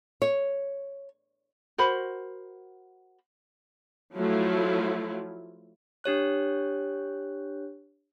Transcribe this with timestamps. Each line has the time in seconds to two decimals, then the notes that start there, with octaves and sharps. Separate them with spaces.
0.22 C#5
1.78 F#4 A#4 C5 B5
4.16 F3 F#3 A3 E4 F4
6.04 D4 G4 C#5 F#6